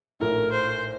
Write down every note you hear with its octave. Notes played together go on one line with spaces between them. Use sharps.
A#1 A2 A3 D#4 A#4
C5